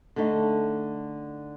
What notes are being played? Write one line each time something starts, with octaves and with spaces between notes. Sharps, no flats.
D3 A3 D#4